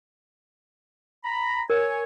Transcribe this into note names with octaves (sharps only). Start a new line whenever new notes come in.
A#5 B5
A#4 C#5 G#5